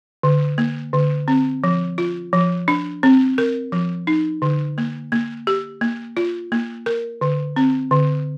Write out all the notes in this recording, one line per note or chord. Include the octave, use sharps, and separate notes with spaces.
D3
A#3
D3
C4
F3
F4
F3
D4
C4
A#4
F3
D#4
D3
A#3
A#3
G4
A#3
F4
A#3
A#4
D3
C4
D3